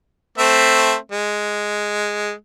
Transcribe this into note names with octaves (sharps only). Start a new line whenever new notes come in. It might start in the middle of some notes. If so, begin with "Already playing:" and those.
A3 C4 E5
G#3